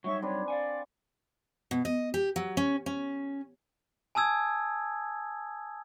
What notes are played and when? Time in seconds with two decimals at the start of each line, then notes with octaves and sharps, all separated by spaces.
0.04 F#3 G3 D#4 C#5 E5 C#6
0.22 C4 D4 B4 C#5
0.48 D5 F5 F#5 G#5
1.71 B2
1.85 D#5
2.14 G4
2.36 F#3
2.57 C#4
2.86 C#4
4.15 G#5 A5 D#6 E6 G#6